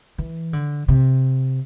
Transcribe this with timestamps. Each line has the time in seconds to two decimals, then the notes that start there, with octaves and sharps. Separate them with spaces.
0.18 E3
0.53 D3
0.88 C3